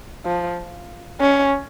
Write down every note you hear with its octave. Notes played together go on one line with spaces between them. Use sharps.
F3
C#4